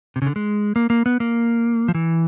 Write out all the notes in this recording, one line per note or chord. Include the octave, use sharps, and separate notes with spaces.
C3
C#3
D3
G#3
A#3
A#3
B3
A#3
F3
E3